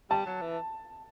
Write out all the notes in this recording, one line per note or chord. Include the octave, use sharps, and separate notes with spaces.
G3 A5
F#3
E3